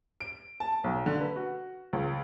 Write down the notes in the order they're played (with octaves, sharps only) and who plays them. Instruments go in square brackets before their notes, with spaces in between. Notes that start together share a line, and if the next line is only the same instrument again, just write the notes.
[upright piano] D7
A5
B1
D3
B4
F#4
C#2